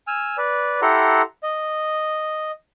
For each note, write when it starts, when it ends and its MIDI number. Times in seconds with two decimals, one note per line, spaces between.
0.07 0.37 80
0.07 0.37 88
0.07 0.37 89
0.37 0.81 71
0.37 0.81 74
0.82 1.22 64
0.82 1.22 67
0.82 1.22 69
0.82 1.22 78
0.82 1.22 82
0.82 1.22 84
1.43 2.51 75